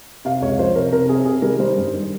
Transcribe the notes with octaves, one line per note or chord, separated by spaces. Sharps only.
C3 F5
C#2 C#5
F3 C5
C3 A#4
C3 A#4
C4 G#4
C3 G#4
G3 A#4
G3 C5
G2
D#3